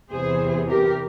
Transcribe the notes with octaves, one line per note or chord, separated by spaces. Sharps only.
E2 C3 E3 G#4 C5
G4 A#4